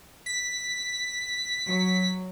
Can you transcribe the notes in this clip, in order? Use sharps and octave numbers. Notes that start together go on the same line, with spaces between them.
B6
F#3